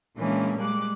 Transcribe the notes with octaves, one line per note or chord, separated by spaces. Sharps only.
A#2 E3 G#3 A#3 C#4 D4
G3 G#3 D6 F#6